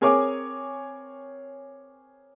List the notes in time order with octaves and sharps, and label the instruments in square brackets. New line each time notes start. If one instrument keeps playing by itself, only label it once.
[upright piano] C4 G#4 A#4 C#5 G#5 D6